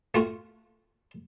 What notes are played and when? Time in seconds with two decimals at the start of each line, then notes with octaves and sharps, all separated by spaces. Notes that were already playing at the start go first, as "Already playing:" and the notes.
0.14 A3 F4 F#4